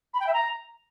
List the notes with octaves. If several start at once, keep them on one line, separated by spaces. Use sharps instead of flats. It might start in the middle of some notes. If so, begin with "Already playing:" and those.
B5
G5
E5
A#5